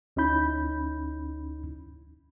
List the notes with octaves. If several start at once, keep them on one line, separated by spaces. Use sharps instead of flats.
D2 C#4 D#4 E4 B5 G6